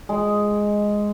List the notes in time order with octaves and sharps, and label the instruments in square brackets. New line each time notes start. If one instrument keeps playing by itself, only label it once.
[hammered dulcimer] G#3